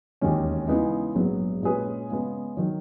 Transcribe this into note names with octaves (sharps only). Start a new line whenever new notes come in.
E1 D#2 D#3 G#3 C#4
C#3 E3 G#3 B3 D#4
A#1 G#2 F#3 B3
A#2 G#3 C#4 G#4 B4
C#3 G#3 B3
D#3 F#3